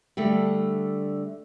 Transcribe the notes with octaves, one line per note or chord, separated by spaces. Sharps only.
D3 G3 A3